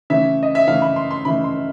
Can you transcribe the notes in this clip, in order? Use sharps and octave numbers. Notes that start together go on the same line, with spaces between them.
C#3 E3 A3 E5
D#5
E5
C#3 E3 A3 F5
B5
C6
C6
C#3 E3 A3 B5
C6